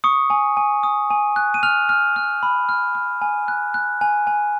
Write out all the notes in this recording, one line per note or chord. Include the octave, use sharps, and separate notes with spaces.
C#6 D#6 C#7
G#5
G#5
D#6
G#5
F#6
D#7
F6 F7
F6
F6
B5
F6
F6
G#5
F#6
F#6
G#5
G#5